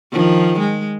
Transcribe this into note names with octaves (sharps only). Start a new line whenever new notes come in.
D#3 F3
G#3